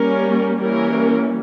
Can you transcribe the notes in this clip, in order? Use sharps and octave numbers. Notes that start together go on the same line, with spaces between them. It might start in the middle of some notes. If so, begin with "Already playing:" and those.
Already playing: G3 A#3 C#4 A#4
E3 G3 A#3 C#4 A#4